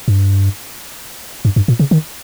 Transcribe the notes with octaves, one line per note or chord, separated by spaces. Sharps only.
G2
G2
G2
A#2
C#3
D#3